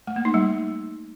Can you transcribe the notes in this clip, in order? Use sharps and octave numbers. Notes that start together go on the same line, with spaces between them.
A3
A#3
D#4
G3